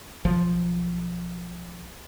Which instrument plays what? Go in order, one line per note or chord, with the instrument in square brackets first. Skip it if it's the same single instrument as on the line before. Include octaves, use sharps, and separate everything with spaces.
[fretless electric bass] B1 F3